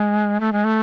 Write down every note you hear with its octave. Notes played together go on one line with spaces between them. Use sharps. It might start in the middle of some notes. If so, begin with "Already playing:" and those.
Already playing: G#3
A3
G#3
A3